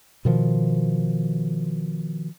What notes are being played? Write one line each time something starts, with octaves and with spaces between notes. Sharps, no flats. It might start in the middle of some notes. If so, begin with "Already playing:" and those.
B2 D#3 F3